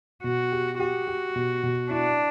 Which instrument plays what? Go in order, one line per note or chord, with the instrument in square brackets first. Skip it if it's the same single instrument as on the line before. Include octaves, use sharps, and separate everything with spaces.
[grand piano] B2 [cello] F#4
[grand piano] G4
[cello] F#4 [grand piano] G4
[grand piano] G4
B2
B2
[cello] D4 [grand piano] E4